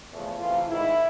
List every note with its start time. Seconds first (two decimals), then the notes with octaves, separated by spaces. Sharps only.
0.10 E2 C#3 F3 A3
0.39 C3 E3 A3 F4
0.68 G#2 D#3 G#3 E4